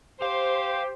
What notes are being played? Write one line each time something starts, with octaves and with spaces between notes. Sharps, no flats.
G4 C5 F5